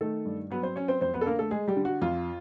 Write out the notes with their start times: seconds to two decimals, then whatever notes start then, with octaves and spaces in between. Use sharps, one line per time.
0.01 D#3 A3 A4
0.25 G2
0.51 F#3 B3 B4
0.63 C4 C5
0.76 F#3 C#4 C#5
0.88 C4 C5
1.01 F2 C4 C5
1.14 B3 B4
1.21 A4
1.26 D3 A#3 A#4
1.39 A3 A4
1.51 G#3 G#4
1.68 G3 G4
1.76 D3
1.85 F#4
2.01 F2 F4